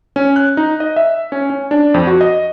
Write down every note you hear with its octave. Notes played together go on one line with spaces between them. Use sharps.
C#4
F#6
D#4
D#5
E5
C#4
C#4
D4
F2
F#4
D#5